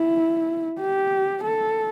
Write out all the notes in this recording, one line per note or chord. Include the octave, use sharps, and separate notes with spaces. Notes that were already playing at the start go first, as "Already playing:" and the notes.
Already playing: E4
G4
A4